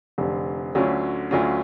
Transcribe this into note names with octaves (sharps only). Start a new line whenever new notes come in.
F1 F2 D3
D2 D3 F#3 C#4 F4
D2 D3 F#3 C#4 F4